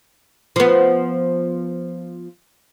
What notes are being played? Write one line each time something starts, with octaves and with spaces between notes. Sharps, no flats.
F3 B3